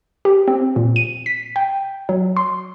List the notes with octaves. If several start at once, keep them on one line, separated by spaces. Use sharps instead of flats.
G4
C4
A#2
D#7
B6
G5
F#3
C6